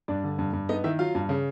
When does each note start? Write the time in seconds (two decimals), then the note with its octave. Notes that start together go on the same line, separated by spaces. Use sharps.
0.08 G2 D4 D5
0.24 D3
0.39 G2
0.53 G2
0.69 B3 D#4 D#5
0.84 D#3 E4 E5
0.99 F#3 F4 F5
1.15 G2
1.29 C#3